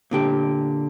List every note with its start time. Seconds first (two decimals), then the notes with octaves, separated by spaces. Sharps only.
0.11 A#2 D3 G4